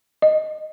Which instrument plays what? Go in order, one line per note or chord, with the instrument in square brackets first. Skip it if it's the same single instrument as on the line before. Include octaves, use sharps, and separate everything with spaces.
[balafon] D#5